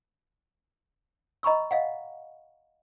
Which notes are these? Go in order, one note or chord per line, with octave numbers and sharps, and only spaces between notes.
D#5 A#5 B5 C#6 E6
D#5 F5 F#5